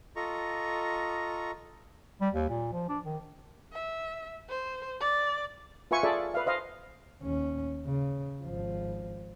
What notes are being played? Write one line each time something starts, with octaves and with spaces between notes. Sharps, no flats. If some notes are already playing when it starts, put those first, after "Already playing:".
F4 A4 D#5 A#5 C#6
G3
D#2
A#2
F3
D4
D#3
E5
C5
D5
F4 B4 E5 G#5 C#6
F4 G#4 A4 D5 E5
B4 E5 F5
C5 D#5 F5
D#2 C#4
C#3
G#1 F3